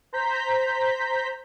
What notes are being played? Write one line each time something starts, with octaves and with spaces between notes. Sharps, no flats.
C5 A#5 G6 B6